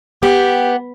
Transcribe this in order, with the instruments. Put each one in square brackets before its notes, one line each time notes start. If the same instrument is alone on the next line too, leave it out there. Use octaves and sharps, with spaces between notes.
[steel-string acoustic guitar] B3 [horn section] G4